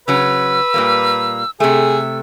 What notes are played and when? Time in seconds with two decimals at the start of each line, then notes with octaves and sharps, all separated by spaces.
0.08 C#3 F#3 C#4 B4 E6
0.74 A#2 G3 A#3
1.60 C3 A3 G#4 E6